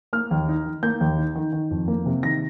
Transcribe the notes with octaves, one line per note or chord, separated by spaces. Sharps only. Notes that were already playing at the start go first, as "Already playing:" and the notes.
A#3 F6
D#2
D#4
D#3
A#3 G6
D#2
D#4
D#3
D#3
F2
A#3
C3
D#3 A#6